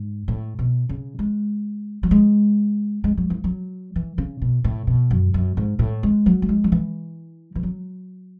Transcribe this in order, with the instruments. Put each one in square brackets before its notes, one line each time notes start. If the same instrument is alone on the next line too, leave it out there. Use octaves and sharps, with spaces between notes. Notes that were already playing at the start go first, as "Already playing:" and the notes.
Already playing: [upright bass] G#2
A2
B2
C#3
G#3
F#3
G#3
G#3
F#3
E3
F#3
E3
C#3
B2
A2
B2
F#2
F#2
G#2
A2
G#3
F#3
A3
G#3
F#3
E3
E3
F#3